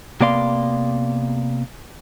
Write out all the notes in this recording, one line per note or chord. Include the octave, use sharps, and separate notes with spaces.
C3 A#3 B3 D5 F5 C6